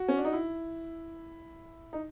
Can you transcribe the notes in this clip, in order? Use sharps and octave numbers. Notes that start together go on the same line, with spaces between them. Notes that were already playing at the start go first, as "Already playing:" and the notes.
Already playing: F#4
C#4
D4
D#4
E4
D#4